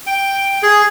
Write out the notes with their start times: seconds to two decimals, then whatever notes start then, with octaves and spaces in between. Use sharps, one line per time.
0.07 G5
0.63 G#4